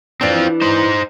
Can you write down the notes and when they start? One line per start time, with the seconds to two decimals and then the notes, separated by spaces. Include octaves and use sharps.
0.21 E3 C4 D4 F4
0.61 D#4 C5